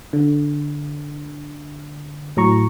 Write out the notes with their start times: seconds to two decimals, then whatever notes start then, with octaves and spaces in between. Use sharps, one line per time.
0.13 D3
2.37 A2 F#3 A#5 C#6